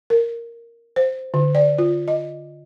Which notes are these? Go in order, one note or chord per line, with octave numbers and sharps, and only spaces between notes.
A#4
C5
D3
D5
F4
D#5